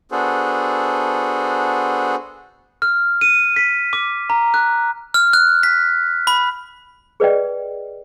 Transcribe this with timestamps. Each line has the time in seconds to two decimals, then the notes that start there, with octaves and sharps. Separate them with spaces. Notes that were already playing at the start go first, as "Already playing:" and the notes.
0.12 B3 D4 F#4 G#4 A4 C5
2.82 F6
3.21 D#7
3.56 B6
3.93 D6
4.30 A#5
4.54 F#6
5.14 F6
5.33 F#6
5.63 B6
6.27 B5
7.20 G#4 B4 D5 D#5 G5